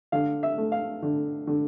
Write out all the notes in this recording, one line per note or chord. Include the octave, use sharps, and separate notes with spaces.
D3 F5
E5
A3
F5
D3
D3